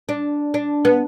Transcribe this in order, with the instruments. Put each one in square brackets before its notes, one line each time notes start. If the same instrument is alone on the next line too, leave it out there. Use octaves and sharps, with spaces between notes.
[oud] D4
D4
B3